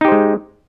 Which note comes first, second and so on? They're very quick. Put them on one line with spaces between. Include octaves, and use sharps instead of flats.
D#4 G4 C5 G#3